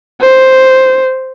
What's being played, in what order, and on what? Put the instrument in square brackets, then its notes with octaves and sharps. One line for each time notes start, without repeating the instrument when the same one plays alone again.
[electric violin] C5